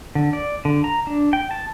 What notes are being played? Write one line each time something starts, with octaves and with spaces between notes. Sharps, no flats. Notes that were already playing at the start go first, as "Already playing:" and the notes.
D3
D5
D3
A#5
D4
G5
A5